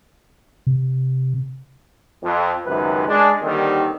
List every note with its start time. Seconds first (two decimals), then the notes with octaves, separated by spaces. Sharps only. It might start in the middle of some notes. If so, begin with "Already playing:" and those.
0.67 C3
2.23 F2
2.66 C#2 F#2 C3 D#3 B4
3.07 G#3 D4
3.42 D#2 D3 D#3 G3 C4